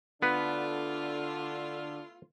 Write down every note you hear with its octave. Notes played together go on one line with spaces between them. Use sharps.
D3 A3 B3 D4 E4 F4 B4